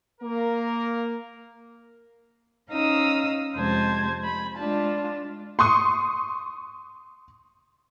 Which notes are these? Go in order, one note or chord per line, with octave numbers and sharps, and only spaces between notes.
A#3 A#4
C#4 D#4 F5 D#6 E6
F2 C3 G#3 C5 A5 G#6
B5
G#3 D4 F4 A5
C6 C#6 D#6